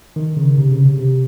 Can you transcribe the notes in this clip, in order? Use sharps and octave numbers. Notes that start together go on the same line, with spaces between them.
D#3
C#3
C3
C#3
C3
C3